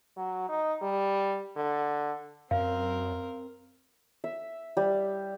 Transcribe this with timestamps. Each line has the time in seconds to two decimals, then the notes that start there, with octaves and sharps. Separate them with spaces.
0.17 F#3
0.49 D#4
0.82 G3
1.56 D3
2.51 F#2 C4 A#4 F5
4.24 E5
4.77 G3